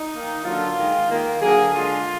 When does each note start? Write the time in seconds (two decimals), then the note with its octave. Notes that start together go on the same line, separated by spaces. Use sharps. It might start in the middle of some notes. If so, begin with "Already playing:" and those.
Already playing: D#4
0.13 D#3 A#3
0.45 D3 F#3 A#3 F4
0.77 D#3 G#3
1.10 D#3 A#3
1.41 D3 F#3 A#3 G#4
1.73 D3 G#3 F4